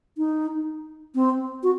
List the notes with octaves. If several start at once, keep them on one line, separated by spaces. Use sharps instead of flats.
D#4
C4
F#4